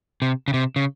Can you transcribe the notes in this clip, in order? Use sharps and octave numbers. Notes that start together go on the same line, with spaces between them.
C3
C#3
C3
C#3